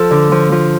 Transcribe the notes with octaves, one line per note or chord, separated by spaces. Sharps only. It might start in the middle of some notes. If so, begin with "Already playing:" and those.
Already playing: F3 A4
D3
F3
F3